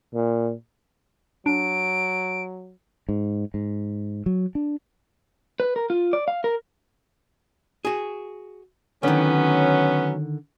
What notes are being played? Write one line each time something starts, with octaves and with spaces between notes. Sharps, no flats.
A#2
F#3 D4 D7
G#2
G#2
F#3
D4
B4
A#4
F4
D5
F5
A#4
F#4 G#4
D3 D#3 F#3 B3 C#4